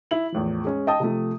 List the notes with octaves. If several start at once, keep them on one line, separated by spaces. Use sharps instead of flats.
E4 F#7
E2 A2 F3
G#3 C#4
D#5 G5 A5 D#6
C3 F3 A3